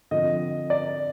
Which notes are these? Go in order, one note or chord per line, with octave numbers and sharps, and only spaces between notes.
D3 F3 C4 D#5
D5